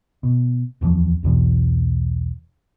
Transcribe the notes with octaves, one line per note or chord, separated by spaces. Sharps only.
B2
D1 E2 E3 F3
B1 E2 B2 E3